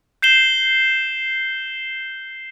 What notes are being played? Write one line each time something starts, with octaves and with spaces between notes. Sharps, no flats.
G6 C7 E7 G7